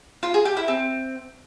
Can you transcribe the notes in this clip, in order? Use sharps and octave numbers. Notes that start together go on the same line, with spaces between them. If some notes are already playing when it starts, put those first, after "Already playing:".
F4
G#4
G4
E4
C4